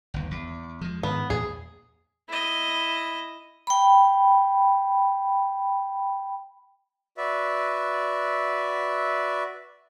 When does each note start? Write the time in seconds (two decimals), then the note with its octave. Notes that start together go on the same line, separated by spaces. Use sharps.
0.14 G1 D#2
0.31 E2
0.81 F3 G#3
1.03 G#2 D#3 B3
1.30 E2 A#2 G#4
2.29 E4 D#5
3.67 G5 B5
7.17 F#4 B4 D5 E5